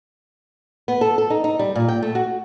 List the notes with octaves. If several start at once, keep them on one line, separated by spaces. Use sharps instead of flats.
B3
A4
A4
D#4
D#4
G3
A#2
G5
A3
F#4